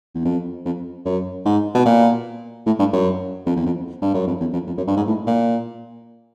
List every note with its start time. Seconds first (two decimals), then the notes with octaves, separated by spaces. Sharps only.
0.15 E2
0.25 F2
0.65 F2
1.06 F#2
1.45 G#2
1.75 B2
1.86 A#2
2.66 A2
2.79 G2
2.93 F#2
3.46 F2
3.56 E2
3.66 F2
4.02 G2
4.14 F#2
4.27 F2
4.40 E2
4.53 F2
4.67 F2
4.77 F#2
4.87 G2
4.97 G#2
5.07 A2
5.26 A#2